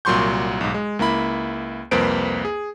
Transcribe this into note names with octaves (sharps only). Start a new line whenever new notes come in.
C2 A#2 F#3 C6 C#6 G6
B1 G#2
G#3
C#2 A#3 E4 B5
C2 F2 A#3 B4 C5 D7
G#4